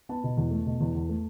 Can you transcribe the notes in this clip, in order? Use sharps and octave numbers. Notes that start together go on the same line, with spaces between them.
B3 A5
B2
E2
A3
B2
E2
E2
A3